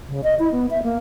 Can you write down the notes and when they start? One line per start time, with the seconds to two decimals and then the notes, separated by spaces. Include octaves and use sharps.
0.09 C#3
0.24 D#5
0.39 E4
0.52 B3
0.71 E5
0.83 A#3